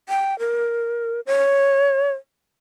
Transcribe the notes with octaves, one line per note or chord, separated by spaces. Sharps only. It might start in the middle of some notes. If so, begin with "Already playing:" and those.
G5
A#4
C#5